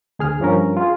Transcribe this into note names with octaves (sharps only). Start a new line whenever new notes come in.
D2 G#4 F6
G2 F3 C#4 A#4
F4 G#4